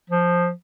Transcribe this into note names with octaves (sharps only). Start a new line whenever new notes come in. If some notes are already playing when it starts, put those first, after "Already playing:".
F3